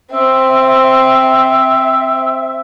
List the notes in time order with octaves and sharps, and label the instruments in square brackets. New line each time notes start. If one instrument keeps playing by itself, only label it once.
[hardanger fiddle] C4 [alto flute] E5